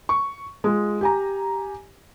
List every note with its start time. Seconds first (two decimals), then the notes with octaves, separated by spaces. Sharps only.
0.09 C#6
0.64 G#3 F4
1.01 G4 G#5 A#5